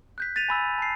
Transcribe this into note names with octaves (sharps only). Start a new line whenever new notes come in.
F#6 G6 B6
A6 B6 D#7 F7
G#5 B5 E6
A5 C7